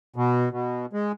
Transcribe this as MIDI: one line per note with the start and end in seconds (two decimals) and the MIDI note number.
0.16 0.49 47
0.52 0.86 47
0.93 1.12 56